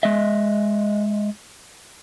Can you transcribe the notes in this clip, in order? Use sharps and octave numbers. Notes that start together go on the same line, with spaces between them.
G#3 D#5 E5